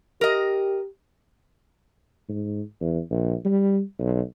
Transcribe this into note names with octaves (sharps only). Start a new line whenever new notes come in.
G4 A#4 D#5
G#2
E2
A#1
G3
B1